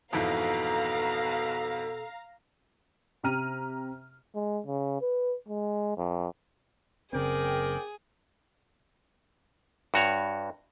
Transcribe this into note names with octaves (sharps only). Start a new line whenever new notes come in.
F2 G#2 B2 E3 A4 F5 A#5
C3 G4 A#5 F6 D#7
G#3
C#3
B4
G#3
F2
F#1 C#3 C4 G#4 A#4 D5 G5
G2 F#4 C#5